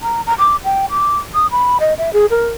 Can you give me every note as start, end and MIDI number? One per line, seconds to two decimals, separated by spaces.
0.03 0.22 82
0.27 0.34 82
0.39 0.56 86
0.64 0.86 79
0.90 1.17 86
1.34 1.47 87
1.51 1.77 83
1.80 1.94 75
1.98 2.13 76
2.13 2.26 68
2.30 2.48 70